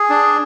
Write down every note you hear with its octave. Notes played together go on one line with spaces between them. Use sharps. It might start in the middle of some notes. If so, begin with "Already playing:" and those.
Already playing: G#4
D4